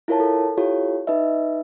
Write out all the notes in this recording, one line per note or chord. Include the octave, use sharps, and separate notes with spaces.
E4 F4 A#4 C#5 A5
A4
E4 F4 G4 A4 C#5
D#4 B4 D#5 E5